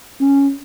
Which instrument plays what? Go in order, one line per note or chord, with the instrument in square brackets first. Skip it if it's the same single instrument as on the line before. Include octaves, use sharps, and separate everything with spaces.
[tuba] C#4